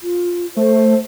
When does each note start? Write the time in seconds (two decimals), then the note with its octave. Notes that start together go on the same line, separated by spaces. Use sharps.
0.03 F4
0.57 A3 C5